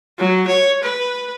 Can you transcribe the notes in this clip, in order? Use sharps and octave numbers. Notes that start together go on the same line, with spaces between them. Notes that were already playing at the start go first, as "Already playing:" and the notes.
F#3
C#5
B4